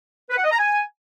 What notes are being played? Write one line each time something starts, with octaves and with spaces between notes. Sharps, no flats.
B4
F#5
D#5
A#5
G#5